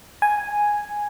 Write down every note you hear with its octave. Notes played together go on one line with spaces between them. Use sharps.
G#5